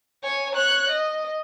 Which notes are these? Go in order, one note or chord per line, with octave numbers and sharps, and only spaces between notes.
C#5 G#5
C#5 F#6
D#5